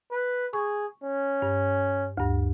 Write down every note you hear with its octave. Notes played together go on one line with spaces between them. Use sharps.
B4
G#4 C#6
C#4
G2
D2 G2